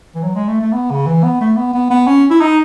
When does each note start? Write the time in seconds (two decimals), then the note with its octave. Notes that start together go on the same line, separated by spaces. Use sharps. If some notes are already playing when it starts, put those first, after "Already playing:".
0.15 E3
0.23 F#3
0.35 G#3
0.48 A3
0.61 A3
0.73 B3
0.91 C#3
1.07 E3
1.24 B3
1.41 A3
1.57 B3
1.74 B3
1.90 B3
2.07 C#4
2.30 E4
2.41 D#4